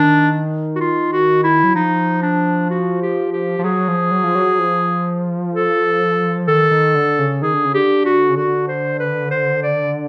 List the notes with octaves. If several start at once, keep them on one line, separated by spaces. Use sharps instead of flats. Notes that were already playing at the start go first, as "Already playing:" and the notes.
Already playing: D#3 D4
F#4
F4
F#4
E4
F#3
F3 D#4
D4
F#4
G4
G4
F3
F#3 G#4
F3
F#3
F3
F#3
F3
A4
D#3 A4
D#3
D3
C#3
D#3 G#4
D3
C#3
D3 G4
F#4
C#3
D3 F#4
C5
B4
C5
D5